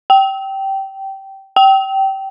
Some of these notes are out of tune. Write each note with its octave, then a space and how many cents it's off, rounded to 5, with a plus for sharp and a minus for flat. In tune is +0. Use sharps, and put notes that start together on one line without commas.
G5 -15
G5 -20